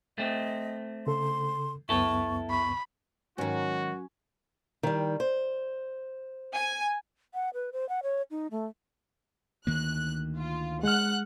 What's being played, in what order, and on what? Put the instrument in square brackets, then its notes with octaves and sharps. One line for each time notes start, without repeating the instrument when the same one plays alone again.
[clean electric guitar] A3 C4 [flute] D#5
[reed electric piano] C#3 A4 [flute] C6
[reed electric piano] C#2 F#2 B3 [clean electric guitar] E4 A4 [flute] C#6
[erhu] B5 [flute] C#6
[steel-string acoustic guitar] G#2 D#3 [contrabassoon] F#3 [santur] C#4 [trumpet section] F#4
[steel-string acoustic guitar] D#3 G3
C5
[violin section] G#5
[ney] F#5
B4
C5
F#5
C#5
D#4
A3
[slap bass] D2 D#3 A#3 [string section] F#6
[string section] F4
[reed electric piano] G#3 F6 [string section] F#5 F#6